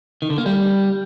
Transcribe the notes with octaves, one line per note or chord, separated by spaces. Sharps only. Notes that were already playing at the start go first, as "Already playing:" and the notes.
D#3
D3
A#3
G3